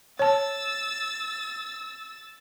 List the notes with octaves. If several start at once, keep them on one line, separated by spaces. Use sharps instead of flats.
C#5 A5 E6 A6